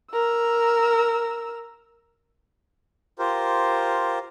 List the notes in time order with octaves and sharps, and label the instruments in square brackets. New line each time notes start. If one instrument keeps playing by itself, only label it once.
[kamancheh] A#4 E6
[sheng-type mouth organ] F4 G4 A#4 C5